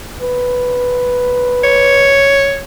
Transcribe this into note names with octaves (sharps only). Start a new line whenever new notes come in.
B4
C#5